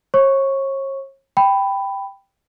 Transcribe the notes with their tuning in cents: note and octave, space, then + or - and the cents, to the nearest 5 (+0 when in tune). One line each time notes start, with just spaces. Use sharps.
C#5 -40 C#6 +0
G5 +0 B5 +10